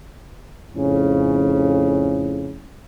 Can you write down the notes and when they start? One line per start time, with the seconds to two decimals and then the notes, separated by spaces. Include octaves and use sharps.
0.74 F2 A2 C#3 C#4